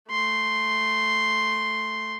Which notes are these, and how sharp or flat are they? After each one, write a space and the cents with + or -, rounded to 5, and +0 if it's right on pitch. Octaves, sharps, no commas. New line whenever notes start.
A3 +0 C6 +0